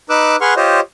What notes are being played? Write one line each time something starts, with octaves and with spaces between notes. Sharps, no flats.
D#4 B4 D6 E6 F#6
G#4 B4 F#5 C6 C#6 F6
F4 G4 C5 C#5 D#5